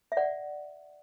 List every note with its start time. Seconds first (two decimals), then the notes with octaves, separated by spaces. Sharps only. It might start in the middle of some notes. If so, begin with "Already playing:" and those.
0.12 E5
0.17 D5 F#5